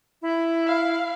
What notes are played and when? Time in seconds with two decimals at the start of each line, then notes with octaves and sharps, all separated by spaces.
0.22 E4
0.66 F5